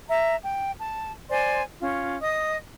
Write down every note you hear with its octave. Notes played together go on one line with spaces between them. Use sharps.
E5 A#5
G5
A5
C5 D5 G#5 C6
C#4 F4
D#5 D#6